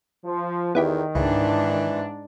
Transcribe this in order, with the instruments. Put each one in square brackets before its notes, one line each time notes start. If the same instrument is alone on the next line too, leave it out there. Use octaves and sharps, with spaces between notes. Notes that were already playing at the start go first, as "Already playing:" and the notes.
[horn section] F3
[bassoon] E2 [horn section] D#3 [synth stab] B3 E4 G4
[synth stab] C#2 [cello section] G#2 D4 [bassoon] E3